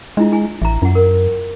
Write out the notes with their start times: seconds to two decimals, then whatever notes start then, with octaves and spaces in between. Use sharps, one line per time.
0.17 G#3 D4 E4 F4
0.32 E4 G#5
0.62 A1 E5 A#5
0.82 F#2 F4 F#5
0.95 A#4